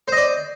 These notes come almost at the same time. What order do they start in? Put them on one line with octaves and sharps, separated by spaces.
C5 D#5 D5